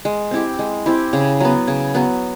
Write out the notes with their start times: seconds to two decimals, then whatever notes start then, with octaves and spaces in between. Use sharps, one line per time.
0.05 G#3
0.31 C4 E4 G4
0.59 G#3
0.86 C4 E4 G4
1.13 C#3
1.40 F#3 B3
1.67 C#3
1.95 F#3 B3